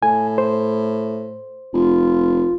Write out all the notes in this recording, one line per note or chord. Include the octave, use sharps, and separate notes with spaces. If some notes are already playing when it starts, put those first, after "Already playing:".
A2 G#5
C5
F1 F4